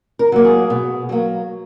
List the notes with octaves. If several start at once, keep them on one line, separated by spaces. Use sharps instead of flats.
A#4
F#3 A#3
G#4
B2
F#3 A#3